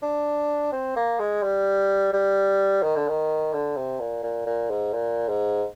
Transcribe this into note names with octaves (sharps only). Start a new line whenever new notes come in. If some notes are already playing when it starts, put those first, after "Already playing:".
D4
C4
A#3
G#3
G3
G3
D#3
D3
D#3
D3
C3
A#2
A#2
A#2
G#2
A#2
G#2